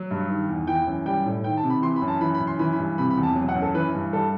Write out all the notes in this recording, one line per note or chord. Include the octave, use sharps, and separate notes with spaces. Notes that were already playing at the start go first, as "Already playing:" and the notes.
Already playing: F#3
G2
D#3
E2
E3 G5
F#2
G3 G5
A2
D#3 G5
A5
C3
B5
E3 C6
B5
F#2
A5
E3 B5
B5
F#2
C6
E3 B5
B5
G2
C3 B5
B5
E2
A5
F#3
F#5
F#2
A4
E3 B4
G2
G3 A4